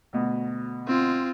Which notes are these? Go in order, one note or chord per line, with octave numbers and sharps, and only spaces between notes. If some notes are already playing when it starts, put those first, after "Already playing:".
D2 B2
C4 F4